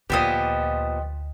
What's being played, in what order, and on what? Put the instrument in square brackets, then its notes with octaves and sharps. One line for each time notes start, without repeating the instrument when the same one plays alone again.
[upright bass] D2 [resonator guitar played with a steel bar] A#2 F3 B3 [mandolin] G4 D#5